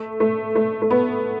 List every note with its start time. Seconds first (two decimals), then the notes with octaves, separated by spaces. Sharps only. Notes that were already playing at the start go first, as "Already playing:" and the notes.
Already playing: A3
0.20 A3
0.55 A3
0.82 A3
0.91 B3